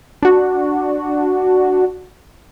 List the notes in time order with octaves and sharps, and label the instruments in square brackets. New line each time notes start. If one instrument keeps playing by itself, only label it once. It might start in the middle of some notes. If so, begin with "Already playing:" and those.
[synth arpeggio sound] D4 F#4